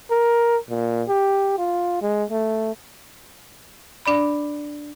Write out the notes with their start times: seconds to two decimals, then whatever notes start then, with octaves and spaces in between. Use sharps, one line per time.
0.11 A#4
0.70 A#2
1.08 G4
1.58 F4
2.02 G#3
2.30 A3
4.06 D4 D5 B5